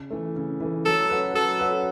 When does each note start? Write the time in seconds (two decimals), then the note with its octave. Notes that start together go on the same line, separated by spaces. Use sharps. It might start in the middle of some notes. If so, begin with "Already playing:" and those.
Already playing: C#3
0.10 E3 A3
0.36 C#3
0.61 E3 A3
0.85 F#3 A4
1.09 C#4 F#4 B4
1.34 F#3 A4
1.59 C#4 F#4 B4